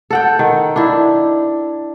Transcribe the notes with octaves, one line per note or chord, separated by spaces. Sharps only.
A4 F#5 G5
D#3
D4 E4